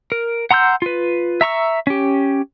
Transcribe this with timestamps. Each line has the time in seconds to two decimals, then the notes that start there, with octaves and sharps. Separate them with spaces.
0.12 A#4
0.51 F#5 A#5 C6 E6 G6
0.82 F4 B4
1.41 E5 A#5 C#6 E6
1.87 C#4 G4